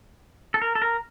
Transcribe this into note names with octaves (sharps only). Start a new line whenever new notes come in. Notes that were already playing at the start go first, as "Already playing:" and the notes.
A4
A#4
A4
A#4